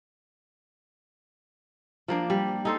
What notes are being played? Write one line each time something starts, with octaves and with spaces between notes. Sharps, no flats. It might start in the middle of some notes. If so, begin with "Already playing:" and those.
F3 A#3 D4
G3
D#4 A4 C5